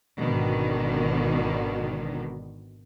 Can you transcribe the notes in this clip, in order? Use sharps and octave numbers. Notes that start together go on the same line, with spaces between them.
G#1 B2 D3 D#3